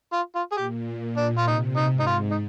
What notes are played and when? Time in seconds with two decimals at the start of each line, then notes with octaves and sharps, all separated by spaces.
0.13 F4
0.35 F4
0.52 G#4
0.57 A#2 G4
1.17 D4
1.38 F4
1.46 C3 D#4
1.77 D#4
1.91 G#2
2.00 D#4
2.06 F4
2.31 D#4